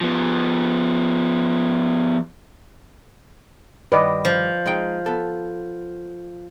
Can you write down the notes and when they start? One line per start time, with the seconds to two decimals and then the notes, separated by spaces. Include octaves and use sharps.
0.01 F3 B3
3.92 G2 D#3 G4 B4 D5 D#5
4.25 F3
4.66 G#3 D#4 G5
5.06 B3 A4